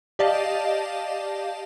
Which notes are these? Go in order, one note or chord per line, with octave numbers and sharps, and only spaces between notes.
G4 D5 D#5 F5 A5